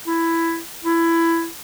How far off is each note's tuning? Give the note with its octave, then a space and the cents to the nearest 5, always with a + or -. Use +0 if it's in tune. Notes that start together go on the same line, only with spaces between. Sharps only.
E4 +10
E4 +15